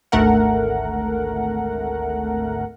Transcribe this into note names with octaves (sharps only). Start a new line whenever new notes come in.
G#1 D2 A3 A#4 F#5